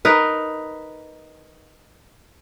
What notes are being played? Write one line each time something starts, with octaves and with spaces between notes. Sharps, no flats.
D#4 A#4 B4